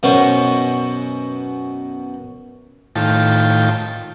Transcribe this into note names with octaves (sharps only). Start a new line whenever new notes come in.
F#2 B2 B3 C#4 C5 C#6
A2 D#3 F4 G5 A5